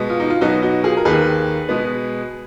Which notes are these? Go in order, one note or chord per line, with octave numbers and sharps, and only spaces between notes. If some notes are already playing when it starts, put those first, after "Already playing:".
Already playing: B2 G#3 B3
F4
D#4
F4
B2 F#3 B3 D#4 F#4
D#4 F#4
F4 G#4
A#4
D#2 D#3 A#3 G#4 B4
B2 G#3 B3